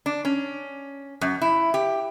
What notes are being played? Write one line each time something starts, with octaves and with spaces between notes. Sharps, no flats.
D4
C#4
F#2
E4
G4